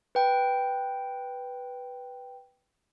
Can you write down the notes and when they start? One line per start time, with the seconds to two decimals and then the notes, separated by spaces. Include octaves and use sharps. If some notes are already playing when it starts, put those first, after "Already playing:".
0.15 B4 G5